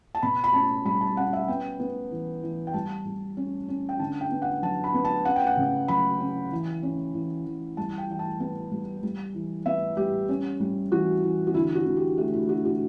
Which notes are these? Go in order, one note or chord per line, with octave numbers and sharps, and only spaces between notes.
A5
B2 B5
B5
C#4 A5
G3 B5
A5
C#4 F#5
E5
B3 G5
B3
E3
E3
G5
G3 A5
G3
C#4
C#4
G5
D3 A5
G5
B3
F#5
F#3 A5
B5
B3
A5
C#4 F#5
G5
F#5
C#3
F#3 B5
C#4
E3
C#4
E3
E3
G3 A5
G5
E3 G5
A5
B3 A5
G3
G3
E3
B3 E5
G3 G4
C#4
G3
E3 F#4
E3
F#4
D3 E4
F#4
D3
G4
A3 F#4
E4
D3 F#4
F#4